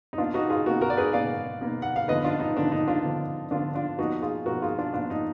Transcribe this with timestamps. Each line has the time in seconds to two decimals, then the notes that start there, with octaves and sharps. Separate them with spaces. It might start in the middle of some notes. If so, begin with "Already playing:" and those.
0.13 D#4
0.18 B2 A#3 D4 F4
0.34 D#4 F#4
0.50 F4 G#4
0.66 B2 A#3 F#4 A#4
0.81 F#4 A#4
0.90 D5
0.97 G#4 B4
1.13 B2 A#3 D5 F5
1.61 B2 A#3
1.82 F#5
1.96 F5
2.08 D3 F3 B3 B4 D#5
2.24 D4 F4
2.40 D#4
2.57 D3 F3 B3 D4
2.72 D#4
2.88 D4 F4
3.03 D3 F3 B3
3.51 D3 F3 B3 D4 F4
3.75 D4 F4
3.99 A#2 F3 B3 D#4 F#4
4.22 F4 G#4
4.46 A#2 F3 B3 F#4 A#4
4.62 F4 G#4
4.78 D4 F4
4.94 A#2 F3 B3 D4 F4
5.10 D#4